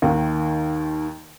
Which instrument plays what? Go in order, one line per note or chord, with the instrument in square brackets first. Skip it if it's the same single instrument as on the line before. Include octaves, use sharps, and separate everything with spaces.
[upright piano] D#2 D#3